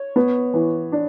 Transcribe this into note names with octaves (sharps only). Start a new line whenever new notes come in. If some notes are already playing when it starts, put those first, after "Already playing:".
Already playing: C#5
B3
E3
D4